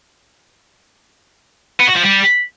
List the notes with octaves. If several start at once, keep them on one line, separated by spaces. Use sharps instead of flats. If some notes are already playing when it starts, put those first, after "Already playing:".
B3
F#4
F3
G3